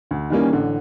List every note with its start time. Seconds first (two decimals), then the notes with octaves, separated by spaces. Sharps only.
0.11 D2
0.30 D#3 E3 G3 A#3 C#4
0.53 A1 D3